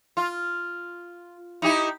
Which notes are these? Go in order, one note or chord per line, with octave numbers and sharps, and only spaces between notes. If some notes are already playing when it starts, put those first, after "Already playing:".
F4
D#4 E4 G4